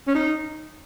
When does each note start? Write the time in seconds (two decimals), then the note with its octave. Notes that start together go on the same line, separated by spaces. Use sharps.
0.08 C#4
0.15 D#4